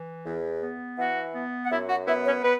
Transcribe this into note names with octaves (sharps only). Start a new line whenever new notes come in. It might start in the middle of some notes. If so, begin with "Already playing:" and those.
Already playing: E3
E2
B3
E3 F#4 F#5
B3
F#5
F#2 E4 E5
F#4 F#5
B3 E4 E5
C#4 C#5
B3 B4